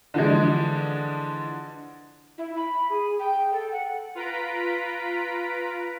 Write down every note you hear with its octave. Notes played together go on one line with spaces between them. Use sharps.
D3 E3 F3 G#3
E4
B5
G#4
G5
A4
F#5
F4 B4 A#5 B6 D7